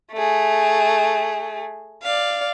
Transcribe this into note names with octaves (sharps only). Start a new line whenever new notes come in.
A3 G#4
D5 F5